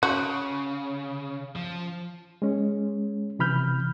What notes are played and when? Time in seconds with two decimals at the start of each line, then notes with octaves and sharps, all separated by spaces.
0.03 C#3 F#4
1.56 F3
2.42 G#3 C#4
3.39 C3 E3 B5 F6 G6